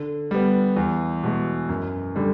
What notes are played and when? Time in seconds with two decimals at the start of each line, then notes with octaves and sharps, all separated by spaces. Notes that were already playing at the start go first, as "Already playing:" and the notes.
Already playing: D3
0.31 G3 B3
0.77 E2
1.23 B2 G#3
1.69 F#2
2.16 D3 G3